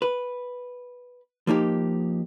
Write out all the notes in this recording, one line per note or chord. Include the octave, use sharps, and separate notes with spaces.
B4
F3 A#3 D#4 G4